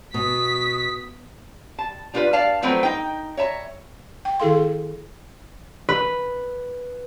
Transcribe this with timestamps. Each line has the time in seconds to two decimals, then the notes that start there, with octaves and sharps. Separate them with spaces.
0.14 B2 F#4 D#6 B6
1.79 A5
2.14 G3 D4 F4 A#4 B4
2.33 D5 F5 A5
2.62 F3 F#3 A3 C4 B4
2.83 D#4 G5
3.37 C#5 E5 A5 A#5
4.25 G5
4.40 D#3 E4 G#4 A4 F5 C6
5.89 B4